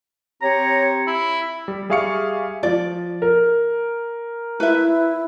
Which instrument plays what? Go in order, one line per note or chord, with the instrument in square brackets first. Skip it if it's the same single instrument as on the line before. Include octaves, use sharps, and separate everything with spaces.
[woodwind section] C4 G4 C#5 [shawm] A#5
[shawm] E4
[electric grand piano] G3
G3 G#4 E5 F5 C#6 C#7
[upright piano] F3 [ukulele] D5
[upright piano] A#4
[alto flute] E4 [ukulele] B4 E5